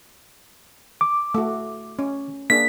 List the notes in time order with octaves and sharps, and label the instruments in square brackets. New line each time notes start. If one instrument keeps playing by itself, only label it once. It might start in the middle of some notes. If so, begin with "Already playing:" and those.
[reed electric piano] D6
[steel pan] A3 F#4
C#4
[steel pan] A#3 D4 G#4 [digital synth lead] B6